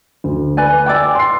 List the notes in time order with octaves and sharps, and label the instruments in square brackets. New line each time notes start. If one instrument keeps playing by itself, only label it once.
[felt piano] D2
[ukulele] B4 D5 G#5
[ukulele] D5 G5 [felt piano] G#5 D6 E6
[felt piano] C6 C7